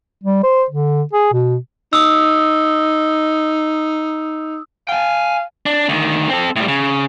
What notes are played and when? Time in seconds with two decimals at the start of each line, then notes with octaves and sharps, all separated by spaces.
0.24 G3
0.44 C5
0.70 D3
1.13 G#4
1.33 B2
1.93 D#4 D#6 E6
4.89 F5 G5 G#5
5.66 D4
5.89 D2 D#3
6.29 C4 A4
6.56 A2 G3
6.68 C#3